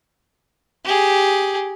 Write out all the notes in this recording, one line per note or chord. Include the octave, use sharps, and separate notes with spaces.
G4 G#4